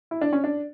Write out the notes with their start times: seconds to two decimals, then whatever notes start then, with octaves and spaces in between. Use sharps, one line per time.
0.11 E4
0.21 D4
0.33 C#4
0.44 D4